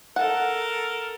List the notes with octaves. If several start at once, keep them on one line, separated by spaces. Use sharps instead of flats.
A4 A#4 F#5